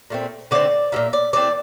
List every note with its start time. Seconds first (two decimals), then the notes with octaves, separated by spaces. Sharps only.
0.10 A#2 A3 C4
0.51 D3 A3 C4 D5
0.92 A#2 F3 A#3 E5
1.13 D5
1.33 E3 A3 C4 D5